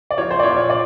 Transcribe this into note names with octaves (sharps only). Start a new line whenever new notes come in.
D5
F3 C#5
C5
D5
A#2 C#5
C#5
D5